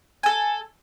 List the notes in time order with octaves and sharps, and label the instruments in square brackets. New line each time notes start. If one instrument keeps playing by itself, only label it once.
[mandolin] A4 G#5